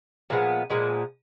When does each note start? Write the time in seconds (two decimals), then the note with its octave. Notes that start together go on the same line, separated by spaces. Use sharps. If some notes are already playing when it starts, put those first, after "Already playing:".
0.30 A#2 F3 G#3 B3
0.70 A#2 F3 G#3 B3